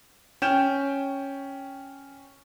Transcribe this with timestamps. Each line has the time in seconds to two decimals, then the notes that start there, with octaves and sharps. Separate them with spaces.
0.42 C#4 G5 G6 E7